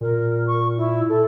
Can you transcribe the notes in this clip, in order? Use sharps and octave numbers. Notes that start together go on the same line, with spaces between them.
A#2 A#4
C#6
E4
A4